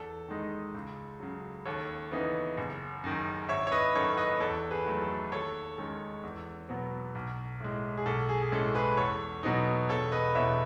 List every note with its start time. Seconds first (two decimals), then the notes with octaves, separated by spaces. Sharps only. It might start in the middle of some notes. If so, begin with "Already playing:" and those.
Already playing: E2 A4
0.28 D#3 G#3 D#4
0.75 C#2
1.20 C#3 F#3
1.65 D#2 A4 C#5
2.11 C#3 E3 B3 D#4
2.57 F#1
3.04 F#2 D#3
3.49 G#1 C#5 E5
3.67 C#5
3.72 B4 D#5
3.95 F#2 D#3 A4 C#5
4.17 B4 D#5
4.40 E2 A4 C#5
4.71 G#4 B4
4.86 D#3 F#3 A3
5.02 A4
5.32 D#2 A4 C#5
5.78 D#3 G#3 C#4 A4
6.23 E2
6.69 B2 F#3 B3
7.15 B1
7.60 A2 G#3
7.97 G#4
8.06 B1 A4
8.29 G#4
8.42 G#4
8.52 A2 G#3 C#4 A4
8.75 G#4 B4
8.97 E2 A4 C#5
9.43 B2 F#3 B3 D#4
9.89 E1 A4 C#5
10.12 B4 D#5
10.35 E2 B2 C#5 E5